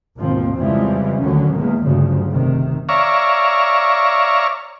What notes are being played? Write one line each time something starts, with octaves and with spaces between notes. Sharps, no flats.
G#1 D#2 B2 F3 C4
F2 C#3 E3 F3 G3 G#3
D2 D3 D#3 F#3 C#4
E2 A#2 G#3 A#3
D2 G2 C#3 F3 F#3
F1 C3 D#3
C#5 D5 E5 F5 A#5 C#6